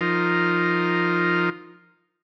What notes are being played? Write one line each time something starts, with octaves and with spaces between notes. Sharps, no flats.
F3 D#4 F4 A#4